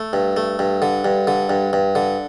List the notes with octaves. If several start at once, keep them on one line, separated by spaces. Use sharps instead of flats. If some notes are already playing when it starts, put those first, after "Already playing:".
Already playing: A3
G2
A3
G2
D3
G2
D3
G2
G2
D3